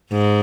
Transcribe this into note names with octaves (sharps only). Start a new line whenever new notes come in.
G#2